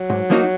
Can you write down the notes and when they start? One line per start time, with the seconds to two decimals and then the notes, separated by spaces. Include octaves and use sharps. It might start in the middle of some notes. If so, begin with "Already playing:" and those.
Already playing: F#3
0.10 G#2
0.30 F3 A#3 D#4 F#4